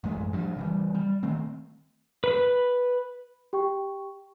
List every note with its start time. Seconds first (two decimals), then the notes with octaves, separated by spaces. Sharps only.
0.04 A1 F#2 G#3 A3
0.33 G2 F3
0.57 C#3 E3 G3
0.95 G3
1.23 D#3 A3 C4
2.24 B4 B5
3.53 G4 G5 C#6